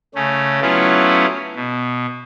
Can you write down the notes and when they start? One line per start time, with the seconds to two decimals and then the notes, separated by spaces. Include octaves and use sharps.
0.15 C#3 A3 C#4
0.62 F#3 A3 B3 C#4 E4 F4
1.55 B2